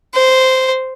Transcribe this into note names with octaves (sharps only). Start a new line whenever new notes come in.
C5